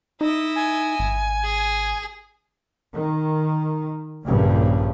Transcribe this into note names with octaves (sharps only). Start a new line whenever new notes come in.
D#4 E4 D#5
G#5
G#1
G#4
D#3
A#1 G2 C#3